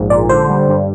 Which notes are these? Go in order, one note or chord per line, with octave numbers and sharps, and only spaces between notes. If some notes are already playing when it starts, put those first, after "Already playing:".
Already playing: A#1 G#2
A#2 D5
D3 C5
G3
G2